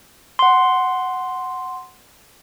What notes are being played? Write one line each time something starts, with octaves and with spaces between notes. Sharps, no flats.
F#5 C6